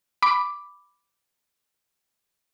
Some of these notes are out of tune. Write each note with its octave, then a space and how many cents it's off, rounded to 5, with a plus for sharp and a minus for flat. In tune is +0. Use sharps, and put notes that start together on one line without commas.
B5 +0 D6 +0